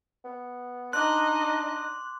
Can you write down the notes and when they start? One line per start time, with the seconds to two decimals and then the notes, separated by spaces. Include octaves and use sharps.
0.25 B3
0.93 D4 D#4 D#5 C6 D6 F#6